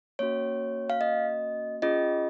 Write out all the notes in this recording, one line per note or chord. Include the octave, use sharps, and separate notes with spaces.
A#3 C#4 F#4 C#5
F5
D#5
C#4 F4 G#4 D#5